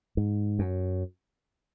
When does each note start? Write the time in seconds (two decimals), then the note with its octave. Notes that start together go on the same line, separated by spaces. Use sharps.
0.17 G#2
0.59 F#2